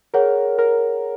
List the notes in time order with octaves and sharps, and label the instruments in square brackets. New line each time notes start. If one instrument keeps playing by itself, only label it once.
[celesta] G#4 C#5 F#5 [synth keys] A#4
[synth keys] A#4